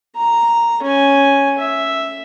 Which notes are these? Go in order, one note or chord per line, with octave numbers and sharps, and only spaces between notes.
A#5
C#4 G#5
E5